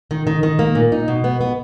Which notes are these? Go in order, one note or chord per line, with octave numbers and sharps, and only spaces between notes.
D#3
D#3
D#3
A#3
A#2
D#4
B2
B3
B3